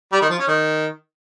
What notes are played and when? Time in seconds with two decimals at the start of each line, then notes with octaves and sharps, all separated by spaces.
0.12 G3
0.21 D#3
0.30 F3
0.39 C#4
0.48 D#3